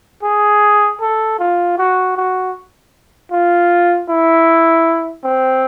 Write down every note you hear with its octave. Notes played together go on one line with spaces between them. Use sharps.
G#4
A4
F4
F#4
F#4
F4
E4
C4